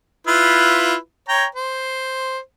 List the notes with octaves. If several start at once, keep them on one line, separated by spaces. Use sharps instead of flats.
E4 F4 B4
C#5 G5 A#5
C5